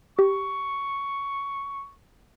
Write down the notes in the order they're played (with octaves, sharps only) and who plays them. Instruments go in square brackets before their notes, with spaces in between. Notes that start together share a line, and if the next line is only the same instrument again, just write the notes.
[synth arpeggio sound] G4 [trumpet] C#6